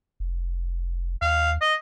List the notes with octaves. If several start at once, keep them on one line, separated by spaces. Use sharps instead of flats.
F1
D#2 F5
D#5